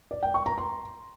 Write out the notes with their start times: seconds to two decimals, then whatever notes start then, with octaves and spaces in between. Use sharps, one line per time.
0.11 D5
0.23 G5
0.34 C#6
0.46 A#5
0.58 C6